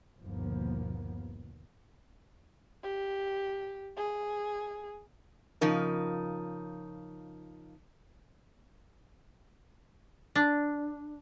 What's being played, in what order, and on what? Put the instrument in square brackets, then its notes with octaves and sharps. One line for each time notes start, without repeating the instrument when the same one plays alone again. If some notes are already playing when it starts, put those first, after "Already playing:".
[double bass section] G1 D#2 B2 F3 A#3 B3
[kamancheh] G4
G#4
[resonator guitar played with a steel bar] C#3 F3 D#4 A#4
[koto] D4